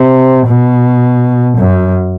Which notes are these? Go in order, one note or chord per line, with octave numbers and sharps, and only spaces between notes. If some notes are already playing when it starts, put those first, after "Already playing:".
Already playing: C3
B2
F#2